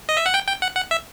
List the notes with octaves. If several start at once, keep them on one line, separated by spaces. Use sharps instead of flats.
D#5
E5
F#5
G5
G5
F#5
F#5
E5